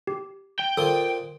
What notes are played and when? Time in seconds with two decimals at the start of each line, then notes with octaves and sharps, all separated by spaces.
0.07 G4
0.60 G5
0.77 A#2 A4 C5 D#6